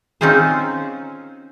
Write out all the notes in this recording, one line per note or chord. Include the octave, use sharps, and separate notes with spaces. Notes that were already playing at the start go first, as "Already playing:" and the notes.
C4 C#4 D#4 F4 G#4 C5